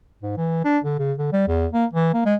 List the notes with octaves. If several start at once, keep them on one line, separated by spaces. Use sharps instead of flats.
G#2
E3
D4
D3
C#3
D3
G3
E2
A#3
E3
A#3
G#3